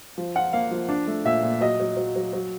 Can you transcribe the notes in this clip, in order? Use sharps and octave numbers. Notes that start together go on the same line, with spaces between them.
F3
F4 F#5
A#3 F5
F3
D4
A3
A#2 E5
A#2
F#3 D#5
F#3
F#3
F#3
F#3